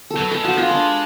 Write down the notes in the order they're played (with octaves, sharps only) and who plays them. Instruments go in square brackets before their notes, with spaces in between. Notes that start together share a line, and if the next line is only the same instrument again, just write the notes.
[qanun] A4
[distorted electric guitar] F#3 [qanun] B4
[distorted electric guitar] G#3 [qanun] A4
[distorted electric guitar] F3 [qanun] F#4
[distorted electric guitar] G#3 [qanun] D4 F4
[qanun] D4